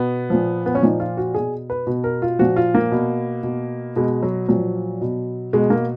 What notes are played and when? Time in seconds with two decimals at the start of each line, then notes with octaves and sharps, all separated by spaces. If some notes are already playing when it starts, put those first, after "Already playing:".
Already playing: B2 B3
0.30 A#2 F3
0.66 B3
0.75 C#4
0.82 A#2 F3 D#4
1.00 F4
1.17 F#4
1.34 B2 G#4
1.70 B4
1.87 B2
2.04 A#4
2.22 F4
2.39 A#2 F3 F#4
2.56 F4
2.75 A#3
2.92 B2
3.43 B2
3.96 B2 G#3
4.23 F#3
4.49 A#2 F3 F#3
5.01 B2
5.53 B2 G#3
5.70 A#3